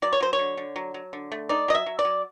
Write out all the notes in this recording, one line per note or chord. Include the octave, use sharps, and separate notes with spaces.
F#3 D5
C#5
F#3 C5
C#5
D3
D3
F#3
F#3
D3
A3
D#4 D5
F#3 D#5
E5
F#3
D5
F#3